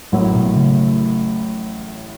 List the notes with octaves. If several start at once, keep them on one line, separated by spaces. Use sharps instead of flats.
A1 A2 F#3 A#3
B2
C#3